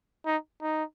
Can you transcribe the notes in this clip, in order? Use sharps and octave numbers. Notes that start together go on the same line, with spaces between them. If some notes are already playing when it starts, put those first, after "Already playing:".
D#4
D#4